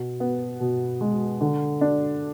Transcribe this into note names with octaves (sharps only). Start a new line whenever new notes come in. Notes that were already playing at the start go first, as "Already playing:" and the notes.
Already playing: B2
B3
B2
G#3
D3
D4